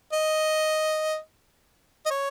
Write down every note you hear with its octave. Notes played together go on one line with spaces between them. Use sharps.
D#5
D#5
C#5